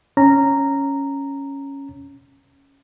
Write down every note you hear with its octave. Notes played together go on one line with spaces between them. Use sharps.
C#4 A#5